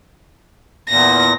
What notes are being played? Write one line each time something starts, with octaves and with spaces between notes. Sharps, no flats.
E2 A#2 A#6